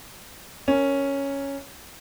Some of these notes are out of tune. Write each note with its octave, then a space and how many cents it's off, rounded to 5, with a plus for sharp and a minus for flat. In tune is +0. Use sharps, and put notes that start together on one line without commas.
C#4 +0 A#4 -5